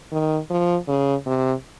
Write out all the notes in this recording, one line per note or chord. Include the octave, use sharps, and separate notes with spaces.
D#3
F3
C#3
C3